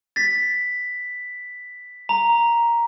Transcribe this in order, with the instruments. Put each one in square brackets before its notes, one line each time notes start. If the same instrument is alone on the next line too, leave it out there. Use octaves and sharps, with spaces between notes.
[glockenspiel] A6 B6
A#5